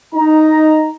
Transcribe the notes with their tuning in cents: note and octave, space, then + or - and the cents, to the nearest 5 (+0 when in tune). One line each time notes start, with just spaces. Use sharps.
D#4 +0 A#5 +0